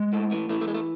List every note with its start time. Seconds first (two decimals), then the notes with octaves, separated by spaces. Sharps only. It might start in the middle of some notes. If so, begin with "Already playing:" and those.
Already playing: G#3
0.13 A2 A3
0.31 E3
0.49 E3 A3
0.61 A3
0.68 G#3
0.74 A3